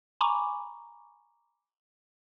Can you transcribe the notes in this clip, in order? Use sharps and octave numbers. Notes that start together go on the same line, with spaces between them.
G#5 A#5 B5 C#6 D6